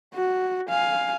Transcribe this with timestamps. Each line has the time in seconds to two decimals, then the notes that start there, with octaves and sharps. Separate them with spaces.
0.14 F#4
0.69 F5 G#5